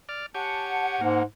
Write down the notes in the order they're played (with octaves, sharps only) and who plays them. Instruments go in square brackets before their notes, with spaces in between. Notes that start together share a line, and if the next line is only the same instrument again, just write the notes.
[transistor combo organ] D5 F6
[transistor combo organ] G4 C#5 G#5 [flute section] F#5 A5
[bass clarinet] G#2 [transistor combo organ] A#3